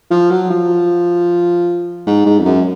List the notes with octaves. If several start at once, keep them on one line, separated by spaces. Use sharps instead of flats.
F3
F#3
F3
G#2
G#2
F2
F#2